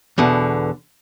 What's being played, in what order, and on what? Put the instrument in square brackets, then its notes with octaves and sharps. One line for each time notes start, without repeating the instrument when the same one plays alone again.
[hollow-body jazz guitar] E2 B2 D3